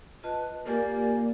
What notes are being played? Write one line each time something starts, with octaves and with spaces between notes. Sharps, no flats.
F4 B4 D#5 A5
A#3 F4 G4 D5 G#5